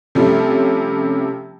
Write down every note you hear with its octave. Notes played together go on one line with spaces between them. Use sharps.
C3 F3 G3 A3 C#4